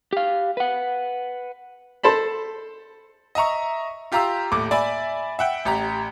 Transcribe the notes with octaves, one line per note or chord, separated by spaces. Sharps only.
G4 F5
B4 F#5
A4 C5 A5 B5
D#5 E5 A#5 C#6
F4 G4 F5 A#5 C6 E6
D#1 A2 D6
D5 E5 G#5 B5
E5 F#5 G5
A1 G4 A#5